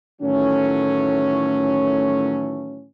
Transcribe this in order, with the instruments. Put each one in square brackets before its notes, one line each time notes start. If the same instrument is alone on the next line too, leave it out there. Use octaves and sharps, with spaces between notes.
[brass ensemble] A2 D#3 E3 F#3 A3 C#4